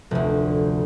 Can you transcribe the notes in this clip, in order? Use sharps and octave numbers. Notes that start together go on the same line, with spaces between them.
F1 D2